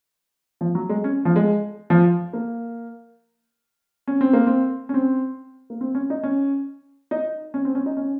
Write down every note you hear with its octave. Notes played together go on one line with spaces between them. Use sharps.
F3
F#3
G#3
C#4
F3
G#3
F3
A#3
C#4
C4
A#3
C4
C#4
C4
A#3
C4
C#4
D#4
C#4
D#4
C#4
C4
C#4
D#4
C#4